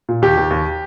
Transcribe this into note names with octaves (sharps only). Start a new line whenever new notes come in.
A#2
D#2 G4
D#2
D#2